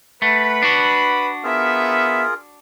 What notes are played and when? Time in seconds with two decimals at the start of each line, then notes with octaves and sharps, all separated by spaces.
0.22 A3 B4 F#5 B5
0.62 D4 F#4
1.44 B3 F4 G#4 A#4 E5